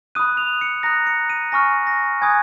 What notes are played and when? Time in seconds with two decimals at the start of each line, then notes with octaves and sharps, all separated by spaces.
0.15 B5 D#6 F#6 D#7
0.37 F7
0.61 C#7
0.83 A#5 D#6 F#6 A#6
1.07 C#7
1.30 D#7
1.52 G#5 C#6 F6 A#6
1.87 A#6
2.21 G#5 B5 D#6 F#6 G#6